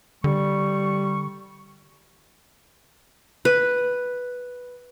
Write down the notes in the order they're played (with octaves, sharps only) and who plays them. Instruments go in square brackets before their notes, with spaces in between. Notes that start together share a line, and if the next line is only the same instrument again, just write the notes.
[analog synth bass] D3 [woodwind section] G3 C#6
[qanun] B4